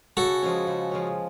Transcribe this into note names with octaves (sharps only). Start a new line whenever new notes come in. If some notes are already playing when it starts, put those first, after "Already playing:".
C#3 F#4 A4
F3 G#3 C#4
C#3
F3 G#3 C#4